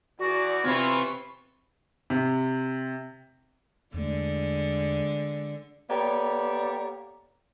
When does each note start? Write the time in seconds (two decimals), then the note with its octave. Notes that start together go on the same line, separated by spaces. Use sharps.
0.19 E2 E3 F#4 D5
0.64 C3 E3 F4 C5 B5 C#6 F6 G#6
2.10 C3
3.94 E2 D3 G#3 A3
5.89 A#3 B3 G4 A4 C#5 D5